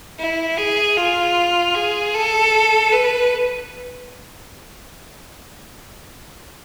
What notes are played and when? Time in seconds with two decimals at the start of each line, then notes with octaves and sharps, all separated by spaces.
0.19 E4
0.57 G#4
0.97 F4
1.75 G#4
2.14 A4
2.92 B4